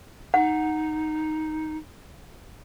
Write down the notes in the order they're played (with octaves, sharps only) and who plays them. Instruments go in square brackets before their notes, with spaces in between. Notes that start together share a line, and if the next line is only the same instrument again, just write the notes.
[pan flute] D#4 [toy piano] F#5